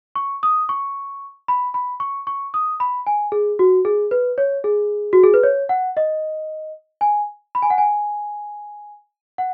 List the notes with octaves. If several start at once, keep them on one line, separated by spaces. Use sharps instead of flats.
C#6
D#6
C#6
B5
B5
C#6
C#6
D#6
B5
G#5
G#4
F#4
G#4
B4
C#5
G#4
F#4
G#4
B4
C#5
F#5
D#5
G#5
B5
G#5
F#5
G#5
F#5